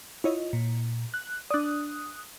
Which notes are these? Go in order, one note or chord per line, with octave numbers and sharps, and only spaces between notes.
E4 F4 C#5 D#5
A#2
F#6
D4 D5 D#6 F#6